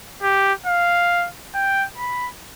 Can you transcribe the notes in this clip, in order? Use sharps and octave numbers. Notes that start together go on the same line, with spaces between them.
G4
F5
G5
B5